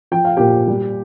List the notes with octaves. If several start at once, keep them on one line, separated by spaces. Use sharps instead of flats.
F3 G5
F5
A#2 G4 G5
G3